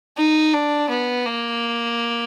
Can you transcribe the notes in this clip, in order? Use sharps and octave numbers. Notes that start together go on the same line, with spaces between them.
D#4
D4
B3
A#3